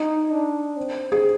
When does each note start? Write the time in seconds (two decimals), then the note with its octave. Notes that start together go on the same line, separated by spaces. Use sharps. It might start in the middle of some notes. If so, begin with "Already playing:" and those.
Already playing: D#4
0.31 D4
0.77 C4
1.12 G#4